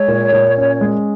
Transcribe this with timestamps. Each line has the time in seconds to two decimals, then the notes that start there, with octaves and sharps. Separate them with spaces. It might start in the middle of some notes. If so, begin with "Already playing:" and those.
Already playing: G#3 C#5
0.08 A#2
0.32 A#2
0.58 C#4
0.81 G#3